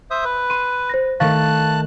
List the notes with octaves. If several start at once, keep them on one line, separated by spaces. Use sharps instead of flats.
C5 E5 D#6
B4
C6 D#7
C5 A#6
D#3 A3 A#4 F5 A5 C#6 F#6 A6